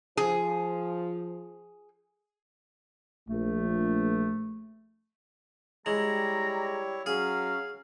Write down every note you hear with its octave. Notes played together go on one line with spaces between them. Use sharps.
F3 G#4
A#1 A3
G3 G#3 E4 C#5 A#5
F#3 C#4 G#4 F5